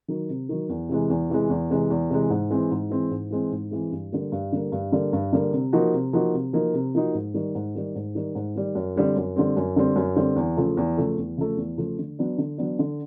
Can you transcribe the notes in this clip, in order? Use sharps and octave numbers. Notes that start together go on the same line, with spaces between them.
D#3 F#3
C3
D#3 F#3
E2
C3 E3 G#3
E2
C3 E3 G#3
E2
C3 E3 G#3
E2
C3 E3 G#3
G#2
E3 G#3 C4
G#2
E3 G#3 C4
G#2
E3 G#3 C4
G#2
E3 G#3 C4
G2
D3 G3 A#3
G2
D3 G3 A#3
G2
D3 G3 A#3
G2
D3 G3 A#3
C3
F3 A#3 D#4 F#4
C3
F3 A#3 D#4 F#4
C3
F3 A#3 D#4 F#4
C3
F3 A#3 D#4 F#4
G#2
D#3 G3
G#2
D#3 G3
G#2
D#3 G3
G#2
D#3 G3
F#2
D3 G3 C4
F#2
D3 G3 C4
F#2
D3 G3 C4
F#2
D3 G3 C4
E2
C#3 F3 A3
E2
C#3 F3 A3
E2
C#3 F3 A3
E2
C#3 F3 A3
D3
F#3 B3 D4
D3
F#3 B3 D4
D3